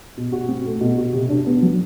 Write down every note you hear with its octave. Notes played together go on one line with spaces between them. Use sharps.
B2
F#4
C4
A3
B2
F#4
C3
D4
B3
F#3